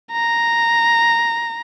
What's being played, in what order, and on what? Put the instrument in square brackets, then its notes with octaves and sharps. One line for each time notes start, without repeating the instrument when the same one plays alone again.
[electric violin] A#5